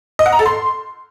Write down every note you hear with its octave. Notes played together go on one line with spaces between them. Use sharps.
D#5
F#5
A#5
A4
C6